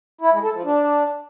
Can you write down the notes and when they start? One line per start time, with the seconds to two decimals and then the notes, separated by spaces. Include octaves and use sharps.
0.21 E4
0.32 G#3
0.43 A4
0.54 F3
0.65 D4